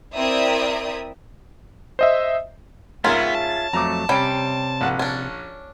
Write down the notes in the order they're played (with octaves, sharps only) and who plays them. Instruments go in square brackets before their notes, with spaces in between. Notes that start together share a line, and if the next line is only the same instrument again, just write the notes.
[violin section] C4 E4 A#4 D5 E5 D#6
[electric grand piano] C5 D#5 E5
[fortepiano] G#2 A#4 C6 [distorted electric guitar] B3 [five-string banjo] C#4 [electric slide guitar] F4 G#4 E5
[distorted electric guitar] A5
[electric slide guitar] F2 F#3 A3 [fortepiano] A#5 D6
[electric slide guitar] C3 G5 [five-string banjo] G3 C#4 B5
[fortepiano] A#1 F#5
[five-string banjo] C#4 D4